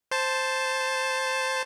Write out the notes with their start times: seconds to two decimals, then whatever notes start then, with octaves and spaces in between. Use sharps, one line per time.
0.11 C5 A5